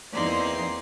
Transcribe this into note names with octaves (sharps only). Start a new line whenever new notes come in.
E2 A#3 C4 D#4 D5 C6